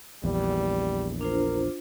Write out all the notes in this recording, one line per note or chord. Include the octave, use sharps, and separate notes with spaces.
A#1 E2 G3
D4 F4 A#4 C5